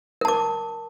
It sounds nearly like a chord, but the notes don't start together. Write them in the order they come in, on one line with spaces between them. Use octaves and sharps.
A#4 A5 D6